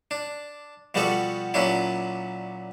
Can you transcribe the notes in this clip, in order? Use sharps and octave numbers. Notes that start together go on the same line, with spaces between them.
D4
B2 F3 G3 B3 F#4 A4
A#2 F#3 C#4 D4 E4